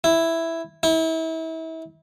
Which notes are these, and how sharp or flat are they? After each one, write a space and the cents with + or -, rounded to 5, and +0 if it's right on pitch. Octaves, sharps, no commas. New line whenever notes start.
E4 +0
E4 -35